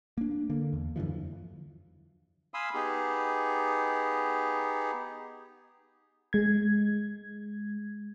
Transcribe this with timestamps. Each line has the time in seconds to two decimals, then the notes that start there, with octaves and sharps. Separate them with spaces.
0.18 A#3 D4
0.50 D3 A#3
0.73 E2
0.96 F#2 D3 E3 F3
2.54 F5 G#5 B5 C6 D#6 E6
2.74 B3 D#4 G4 G#4
6.33 G#3 G#6